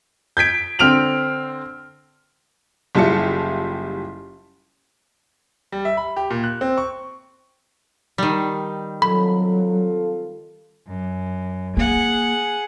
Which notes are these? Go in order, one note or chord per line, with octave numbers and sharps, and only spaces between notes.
G6 G#6 B6 D7
D3 C4 F6 D7 F7 F#7
F#1 G3 E4 F4 A5 C#7
G3
E5
B5
G4
A#2
F#6
C4
C#6
D#3 G3
F#3 C4 F4 A4 B5
F#2
A#3 G#4 F#5